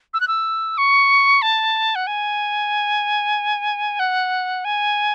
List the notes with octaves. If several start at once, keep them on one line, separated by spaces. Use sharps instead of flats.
E6
F#6
E6
C#6
A5
F#5
G#5
F#5
G#5